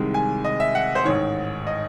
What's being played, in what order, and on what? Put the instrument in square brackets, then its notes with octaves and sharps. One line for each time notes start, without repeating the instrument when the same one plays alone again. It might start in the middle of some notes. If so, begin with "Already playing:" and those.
Already playing: [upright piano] C2 C3 D#3 G#3
G#5
D#5
E5
F#5
C5
A1 G#2 D#3 C#5
D#5